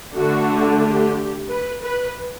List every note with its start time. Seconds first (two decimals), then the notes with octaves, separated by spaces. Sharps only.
0.14 D3 A3 D4 F#4
0.81 G4
1.48 B4
1.82 B4